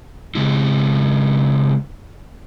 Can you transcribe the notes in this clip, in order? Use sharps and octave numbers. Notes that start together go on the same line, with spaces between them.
C#3 G#3 E4